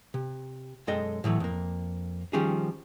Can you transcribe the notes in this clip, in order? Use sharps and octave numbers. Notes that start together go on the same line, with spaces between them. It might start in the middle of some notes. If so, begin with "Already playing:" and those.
C3
B1 F#2 G#3 A4 D#5 G5
A2 E3 F#3 A3
F2 A#3
D#3 F3 G3 C#4 G4 G#4